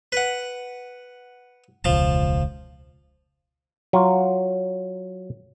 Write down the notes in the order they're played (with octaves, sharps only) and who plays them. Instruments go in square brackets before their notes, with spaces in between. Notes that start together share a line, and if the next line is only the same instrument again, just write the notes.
[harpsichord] B4 F#5
[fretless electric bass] E1 C#2 [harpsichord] F3 A5
[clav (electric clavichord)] F#3 F4